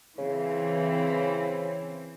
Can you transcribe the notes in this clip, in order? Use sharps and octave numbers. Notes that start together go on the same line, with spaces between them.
C#3 E3 C4